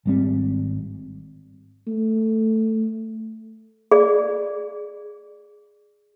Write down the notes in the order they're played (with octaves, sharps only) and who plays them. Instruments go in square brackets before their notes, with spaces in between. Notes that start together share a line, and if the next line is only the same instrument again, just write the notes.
[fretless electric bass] G#1 G3 C4
[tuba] A3
[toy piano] G#4 D5